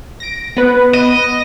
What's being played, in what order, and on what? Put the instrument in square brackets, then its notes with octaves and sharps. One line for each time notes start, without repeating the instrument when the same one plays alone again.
[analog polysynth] A#6 D7
B3 B4
[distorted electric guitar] D#5